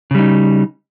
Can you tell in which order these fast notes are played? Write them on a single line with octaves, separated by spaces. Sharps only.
C#3 G3 D#4